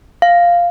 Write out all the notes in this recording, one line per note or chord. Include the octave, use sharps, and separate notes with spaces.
F5